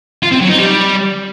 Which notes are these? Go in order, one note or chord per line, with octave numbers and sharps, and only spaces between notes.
F4
C4
F#3
D#4
G3